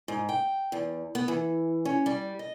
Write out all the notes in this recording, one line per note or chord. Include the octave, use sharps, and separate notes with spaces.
G#2
G5
E2
B3
E3
C#4
G3
D#5